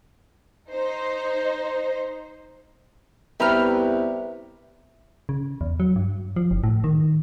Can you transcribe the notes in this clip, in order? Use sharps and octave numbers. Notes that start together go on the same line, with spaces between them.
D#4 C5
C2 B3 G4 B4 C5 E5 A#5 F6
C#3
E2
F#3
G2
F3
F#1
A2
D#3